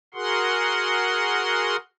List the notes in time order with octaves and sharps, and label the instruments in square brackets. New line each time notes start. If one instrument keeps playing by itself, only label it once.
[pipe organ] F#4 G#4 A#4 F#5 C6